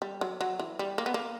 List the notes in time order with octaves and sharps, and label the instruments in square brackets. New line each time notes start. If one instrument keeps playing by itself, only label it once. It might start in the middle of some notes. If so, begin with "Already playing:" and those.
[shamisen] G3
F#3
F#3
E3
G3
A#3
B3
A#3